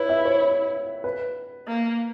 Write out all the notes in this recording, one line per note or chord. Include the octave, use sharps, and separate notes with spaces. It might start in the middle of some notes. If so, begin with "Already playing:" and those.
Already playing: E4 B4 C#5
E5
C#5
B4
A#3